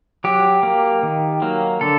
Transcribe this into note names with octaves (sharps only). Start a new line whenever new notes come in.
F#3 G4
A#3
D#3
F#3 A#3
D3 A4